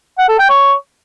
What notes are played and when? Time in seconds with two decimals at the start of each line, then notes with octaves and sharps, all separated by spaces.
0.18 F#5
0.29 A4
0.39 G5
0.49 C#5